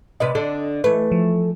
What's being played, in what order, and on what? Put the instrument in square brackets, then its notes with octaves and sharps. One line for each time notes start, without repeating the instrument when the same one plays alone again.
[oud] C3 B4 D5 [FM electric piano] D#5
[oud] D3 D4 A4
[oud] E3 A3 [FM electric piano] B4
[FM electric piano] F3